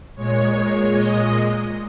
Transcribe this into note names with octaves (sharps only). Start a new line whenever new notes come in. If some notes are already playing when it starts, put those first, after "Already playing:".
A#2 G#3 C#5
D#5